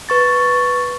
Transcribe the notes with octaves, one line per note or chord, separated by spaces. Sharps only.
B4 C#6 A6